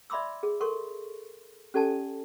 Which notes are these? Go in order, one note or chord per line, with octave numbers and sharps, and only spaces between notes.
D5 E5 B5 C6 D6 E6
G#4
A4 A#4 C6 C#6
C#4 G4 A4 D5 G#5 A5